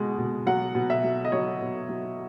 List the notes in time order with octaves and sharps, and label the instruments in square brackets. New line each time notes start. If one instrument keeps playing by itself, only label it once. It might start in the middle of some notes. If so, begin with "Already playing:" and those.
Already playing: [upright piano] B2 G#3 F#5
B2
F#3 F#5
B2
E5
F#3
D#5
F#3 C#5
B2
F#3